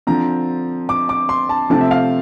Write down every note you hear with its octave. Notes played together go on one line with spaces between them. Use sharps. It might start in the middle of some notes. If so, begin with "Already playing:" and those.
D3 F3 C4 A#5
D6
D6
C6
A5
C3 F3 A3 C4 A5
E5
F5